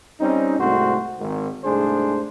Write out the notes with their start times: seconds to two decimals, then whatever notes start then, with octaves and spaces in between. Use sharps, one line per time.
0.21 G3 C4 C#4 D#4
0.59 C2 G#2 A3 C4 F#4 C5
1.20 G#1 D#3
1.64 C2 G#2 A3 D4 G#4 C5